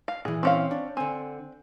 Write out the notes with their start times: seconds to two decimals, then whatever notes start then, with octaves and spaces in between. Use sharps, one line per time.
0.08 F5
0.25 A#2 E3 G#4
0.43 C4 C#4 F5
0.71 D4
0.97 D3 C4 G#5